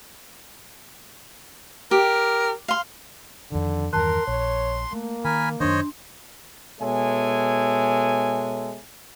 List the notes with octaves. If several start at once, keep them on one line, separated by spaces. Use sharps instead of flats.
G4 A#4
F5 C6
F2 D3 D#3
E2 G2 D#3 A#4 A5 C6 F#6
A#1 C#5
A3 A#3
D#3 A#4 G#5 B5
F#2 D#3 D4 C5 C#5 D#5 C6
B2 G#3 A4 C#5 E5 G#5